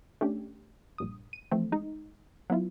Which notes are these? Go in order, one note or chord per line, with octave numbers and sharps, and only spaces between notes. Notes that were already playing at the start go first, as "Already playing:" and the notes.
A3 C#4 D4 G4
A#1 G2 D#6
D#7
E3 F3 A3 C4
G#3 D#4
F#3 B3 E4 F4